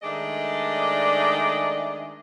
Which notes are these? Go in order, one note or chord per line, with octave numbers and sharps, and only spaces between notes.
D#3 G#3 A3 D4 D5 D#5